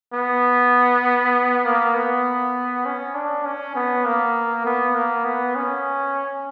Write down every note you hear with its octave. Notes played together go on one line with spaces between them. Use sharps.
B3
A#3
B3
C#4
D4
C#4
B3
A#3
B3
A#3
B3
C#4